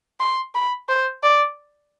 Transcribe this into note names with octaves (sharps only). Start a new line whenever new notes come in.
C6
B5
C5
D5